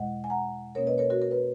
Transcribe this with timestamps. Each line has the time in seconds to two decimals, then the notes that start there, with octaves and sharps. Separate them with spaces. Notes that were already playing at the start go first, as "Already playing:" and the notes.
Already playing: E2 B2 G#3 D#5 F#5
0.24 G#5
0.30 F#5 A#5
0.75 B2 A#3 C#4 A#4 C#5
0.87 B4 D#5
0.98 A#4 C#5
1.10 F#4 A#4
1.22 A#4
1.31 B4